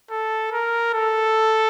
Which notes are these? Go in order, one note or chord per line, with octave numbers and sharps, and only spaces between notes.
A4
A#4
A4